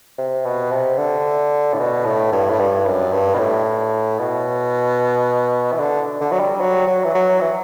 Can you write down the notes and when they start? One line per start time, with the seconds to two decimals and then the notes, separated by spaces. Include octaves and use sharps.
0.18 C3
0.45 B2
0.72 C3
0.98 D3
1.73 A2
1.79 B2
2.05 A2
2.32 G2
2.50 A2
2.59 G2
2.86 F#2
3.12 G2
3.34 B2
3.39 A2
4.19 B2
5.72 E3
5.79 D3
6.21 D3
6.31 F#3
6.40 G3
6.60 F#3
6.87 F#3
7.04 E3
7.15 F#3
7.41 E3